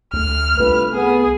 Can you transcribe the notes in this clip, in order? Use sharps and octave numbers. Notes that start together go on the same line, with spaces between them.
D2 A3 F6
C2 G2 A3 F4 B4
B3 G#4